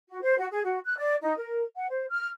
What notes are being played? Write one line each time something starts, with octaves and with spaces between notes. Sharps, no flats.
F#4
C5
F#4
G#4
F#4
F#6
D5
D#4
A#4
F#5
C5
F6